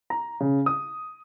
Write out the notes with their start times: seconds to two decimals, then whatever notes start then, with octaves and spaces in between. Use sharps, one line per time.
0.10 A#5
0.40 C#3
0.66 D#6